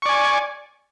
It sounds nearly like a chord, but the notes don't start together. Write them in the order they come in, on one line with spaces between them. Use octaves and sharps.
C#6 D5 G#5